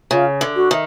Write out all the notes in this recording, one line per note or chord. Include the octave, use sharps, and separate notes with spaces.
C#3 F4
D3
F#4
D#3